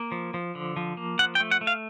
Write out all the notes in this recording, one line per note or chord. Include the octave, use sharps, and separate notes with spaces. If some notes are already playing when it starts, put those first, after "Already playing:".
Already playing: A#3
F3
F3
D3
F3
A#3
F3 F#5
G5
A3
F#5
A3
F5